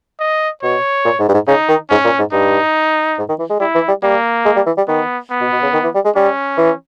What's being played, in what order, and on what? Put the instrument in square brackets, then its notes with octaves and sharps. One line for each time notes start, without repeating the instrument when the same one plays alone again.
[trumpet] D#5
[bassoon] B2 [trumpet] C#5
[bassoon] A#2
G#2
G2
G#2
[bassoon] C#3 [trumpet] D#4
[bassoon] D#3
[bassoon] G#2 [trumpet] C#4
[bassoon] A#2
G#2
[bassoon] G2 [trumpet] D#4
[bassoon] G#2
D#3
E3
G#3
[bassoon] G3 [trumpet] E4
[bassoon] E3
G3
[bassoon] G3 [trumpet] A#3
[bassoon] G#3
G3
E3
G3
[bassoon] D#3 [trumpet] B3
[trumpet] B3
[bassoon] B2
B2
C#3
D#3
E3
G3
G#3
[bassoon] G3 [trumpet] C#4
[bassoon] E3